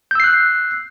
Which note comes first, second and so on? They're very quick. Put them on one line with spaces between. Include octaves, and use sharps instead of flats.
G6 E6 C7 F#6